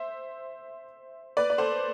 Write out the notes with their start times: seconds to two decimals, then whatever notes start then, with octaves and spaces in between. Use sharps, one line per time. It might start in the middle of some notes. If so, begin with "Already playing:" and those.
Already playing: C5 E5
1.37 B4 D5
1.50 D5
1.58 A4 C5